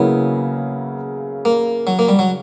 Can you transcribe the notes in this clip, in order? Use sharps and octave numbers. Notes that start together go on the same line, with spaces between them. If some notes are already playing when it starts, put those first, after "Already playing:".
Already playing: C#3 F#3 A#3 B3 E4
A#3
F#3
A#3
G3
F#3